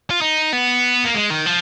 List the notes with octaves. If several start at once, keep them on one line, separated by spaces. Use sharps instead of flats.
F4
D#4
B3
A#3
G#3
D#3
F3